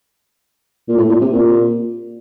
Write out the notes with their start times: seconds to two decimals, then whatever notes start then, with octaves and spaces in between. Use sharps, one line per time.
0.88 A#2
0.97 A2
1.08 A#2
1.21 C3
1.33 A#2